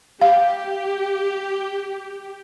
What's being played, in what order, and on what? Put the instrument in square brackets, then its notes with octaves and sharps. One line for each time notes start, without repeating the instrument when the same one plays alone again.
[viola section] G4 [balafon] F5